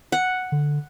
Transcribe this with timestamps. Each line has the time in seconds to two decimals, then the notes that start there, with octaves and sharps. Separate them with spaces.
0.12 F#5
0.52 D3